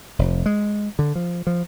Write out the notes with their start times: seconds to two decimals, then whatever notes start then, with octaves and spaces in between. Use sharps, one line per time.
0.19 F1
0.46 G#3
0.99 D3
1.15 F3
1.47 F3